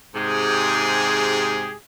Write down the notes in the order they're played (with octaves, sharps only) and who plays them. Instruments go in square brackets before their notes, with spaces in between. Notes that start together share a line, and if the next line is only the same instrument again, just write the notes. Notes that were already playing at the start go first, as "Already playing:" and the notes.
[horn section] G#2 C3 G4 G#4